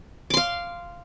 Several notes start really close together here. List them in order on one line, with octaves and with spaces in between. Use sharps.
D6 C6 F5